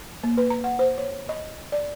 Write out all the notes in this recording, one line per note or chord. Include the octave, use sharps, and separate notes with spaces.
A#3
B4
A#5
F#5
C5
C#5
D#5
D5